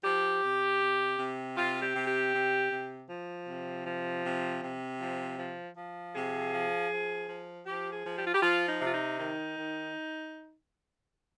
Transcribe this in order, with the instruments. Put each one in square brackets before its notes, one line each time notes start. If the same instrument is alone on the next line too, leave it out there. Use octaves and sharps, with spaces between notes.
[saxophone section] F3 G4
C3
C3
C3
C3 F4
G4
C3
G4
C3
C3
F3
C3
F3
C3
C3
F3
F3
F3
C3 G#4
F3
F3
F3
F3 G4
G#4
F3
G4
F4
G4
F3 F4
D#4
C3
F4
D#4
D#3 D#4
D#3